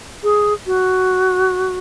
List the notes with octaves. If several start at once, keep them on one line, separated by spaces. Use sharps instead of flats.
G#4
F#4